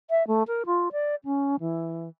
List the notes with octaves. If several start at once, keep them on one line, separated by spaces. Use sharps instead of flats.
E5
A3
A#4
F4
D5
C#4
E3